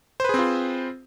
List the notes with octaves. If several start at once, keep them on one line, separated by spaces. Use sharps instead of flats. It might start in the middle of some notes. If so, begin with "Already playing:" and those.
C4 F4 G#4 B4 C5